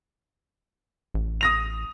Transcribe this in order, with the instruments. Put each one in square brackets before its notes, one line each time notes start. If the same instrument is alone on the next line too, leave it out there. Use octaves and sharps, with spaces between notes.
[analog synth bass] A1
[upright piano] D#6 A#6 F7